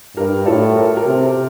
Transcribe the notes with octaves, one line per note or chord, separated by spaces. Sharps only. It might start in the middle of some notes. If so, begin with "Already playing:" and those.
G2 G4 A#4
A2 F4 A4
A#4
A4
G4 A#4
C3